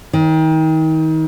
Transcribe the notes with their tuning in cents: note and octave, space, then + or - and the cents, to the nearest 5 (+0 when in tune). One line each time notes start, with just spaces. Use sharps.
D#3 +30